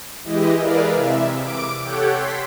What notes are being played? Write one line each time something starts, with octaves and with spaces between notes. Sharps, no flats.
E3 G#3 E4 G4 D#5
E4 G#4 A#4 B4 D5 F5
C3 E5
D6 D7
G4 A4 C#5 F#5 G5
C6 B6